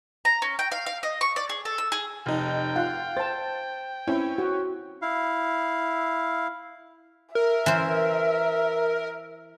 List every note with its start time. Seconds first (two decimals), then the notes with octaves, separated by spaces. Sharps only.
0.25 A#5
0.42 C#4
0.59 G5
0.72 F5
0.86 F5
1.03 D#5
1.21 C#6
1.36 D5
1.49 G#4
1.65 A4
1.78 E6
1.92 G#4
2.26 F1 D#4 G5
2.76 F4 F#5
3.17 C5 A5 A6
4.08 C4 C#4 E4
4.38 F#4
5.02 E4 F5
7.35 A#4 E5
7.66 E3 C5